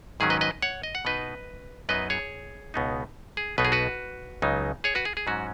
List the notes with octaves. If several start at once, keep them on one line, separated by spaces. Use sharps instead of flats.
G#2 D#3 F#3 C#4 G#4
B4 D#5
B4 D#5
C#5 F#5
D#5
F#5
B2 B3 D#4 B4 D#5
F#2 F#3 B3 D#4 B4 D#5
G#4 C#5
C#2 B2 B3 D#4
G#4
B1 B2 B3 D#4 B4
G#4
F#4 B4
C#2 C#3 F#3 D#4
G#4 C#5
F#4 B4
G#4
G#4
G#2 F#3 C#4 F#4